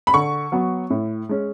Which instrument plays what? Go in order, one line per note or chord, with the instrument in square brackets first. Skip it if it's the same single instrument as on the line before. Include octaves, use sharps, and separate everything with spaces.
[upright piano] B5
D3 C#6
F#3 B3
A2
G#3 C#4